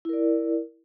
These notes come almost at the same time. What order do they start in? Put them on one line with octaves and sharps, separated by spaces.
E4 A#4 D5